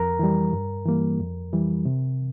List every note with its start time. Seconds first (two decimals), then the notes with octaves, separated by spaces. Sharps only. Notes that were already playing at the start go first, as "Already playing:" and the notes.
Already playing: F2 A#4 A#5
0.19 E3 G3
0.53 G2
0.85 E3 G3 A#3
1.19 F2
1.53 E3 G3
1.85 C3